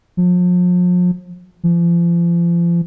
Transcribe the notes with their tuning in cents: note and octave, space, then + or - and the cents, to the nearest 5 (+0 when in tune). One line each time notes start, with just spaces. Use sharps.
F3 +40
F3 -35